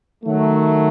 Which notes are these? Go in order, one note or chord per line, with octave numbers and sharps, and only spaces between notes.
D#3 F#3 A3